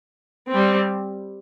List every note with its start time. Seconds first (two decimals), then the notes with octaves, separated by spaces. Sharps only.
0.51 G3 C4